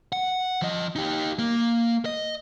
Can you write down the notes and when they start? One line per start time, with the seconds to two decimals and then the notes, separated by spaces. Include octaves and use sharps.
0.13 F#5
0.62 F3 D#5
0.96 D#4 G4
1.39 A#3
2.05 D#5